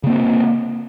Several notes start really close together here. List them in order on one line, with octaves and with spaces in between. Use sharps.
C#3 A#3 C4